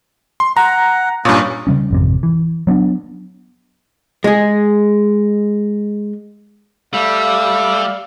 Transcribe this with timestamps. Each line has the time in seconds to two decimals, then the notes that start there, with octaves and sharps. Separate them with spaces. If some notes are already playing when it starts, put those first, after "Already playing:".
0.40 C6
0.57 F#5 A#5
1.25 G2 A#2 A#3 C#4 D#6
1.67 C#3 G3 C#4
1.91 G#1 F2 C3
2.23 E3
2.67 F#3 B3 C#4 D4
4.24 G#3 G#4
6.93 G3 A3 D5 F5 E6